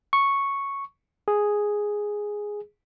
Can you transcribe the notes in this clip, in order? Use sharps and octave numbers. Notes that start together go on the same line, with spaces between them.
C#6
G#4